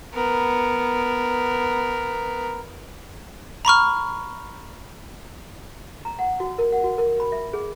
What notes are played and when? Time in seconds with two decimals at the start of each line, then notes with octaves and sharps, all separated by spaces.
0.14 B3 A#4
3.65 A#5 B5 C#6 F6
6.05 A#5
6.19 F#5
6.40 F#4
6.58 A#4
6.72 F#5
6.84 F#4
6.98 A#4
7.20 B5
7.32 E5
7.53 G#4